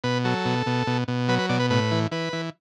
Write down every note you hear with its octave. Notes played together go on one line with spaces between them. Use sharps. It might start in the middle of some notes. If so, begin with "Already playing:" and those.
B2 B4
F#3 A4
B2
B2
B2
B2
F#3 B4
B4
B2 D5
B4
A2 B4
E3
E3 B4
E3